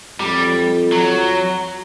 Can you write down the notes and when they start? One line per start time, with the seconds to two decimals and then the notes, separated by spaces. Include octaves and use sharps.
0.19 F2 G3
0.92 F#3